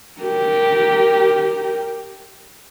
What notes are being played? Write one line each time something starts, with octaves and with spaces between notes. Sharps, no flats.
G4 A#4